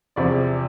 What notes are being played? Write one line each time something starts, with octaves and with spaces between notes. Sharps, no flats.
E2 C3 F3 C4 D5